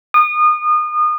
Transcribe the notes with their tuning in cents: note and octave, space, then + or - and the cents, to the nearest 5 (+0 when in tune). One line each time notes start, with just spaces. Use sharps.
D#6 -30